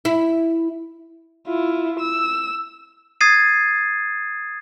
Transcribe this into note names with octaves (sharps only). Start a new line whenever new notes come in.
E4
E4 F4
E6
D#6 G#6 A6 C7 D#7